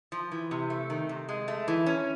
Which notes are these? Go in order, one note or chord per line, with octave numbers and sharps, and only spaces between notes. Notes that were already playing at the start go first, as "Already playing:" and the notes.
F3
E3
C3
A3
D#3
C3
G#3
A3
E3
C#4